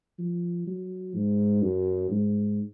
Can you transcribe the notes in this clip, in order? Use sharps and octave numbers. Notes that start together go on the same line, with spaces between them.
F3
F#3
G#2
F#2
G#2